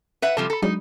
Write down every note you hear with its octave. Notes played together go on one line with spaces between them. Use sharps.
B4 E5 F#5
C3 F3 G3 A4
A4 A#5 B5
F#3 G#3 D4 D#4